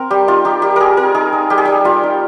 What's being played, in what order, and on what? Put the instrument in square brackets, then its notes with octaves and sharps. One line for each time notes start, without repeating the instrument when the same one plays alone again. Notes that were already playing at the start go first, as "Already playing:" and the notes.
Already playing: [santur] C4 A#4
G3 G4
D#4 F4
D#4 G4
G3 G4
G3 G#4 A#4
C4 A#4
D#4 G#4
D#4
G3 G4
G#4
G3 G4
G3 F4
D#4